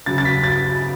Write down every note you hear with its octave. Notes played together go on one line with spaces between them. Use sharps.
C#3 F#3 A6
A6
B6
A6